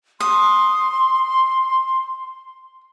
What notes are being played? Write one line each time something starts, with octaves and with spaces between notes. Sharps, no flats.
C6 D#6